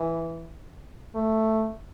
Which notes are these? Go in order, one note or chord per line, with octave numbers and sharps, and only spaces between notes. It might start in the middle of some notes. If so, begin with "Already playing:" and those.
Already playing: E3
A3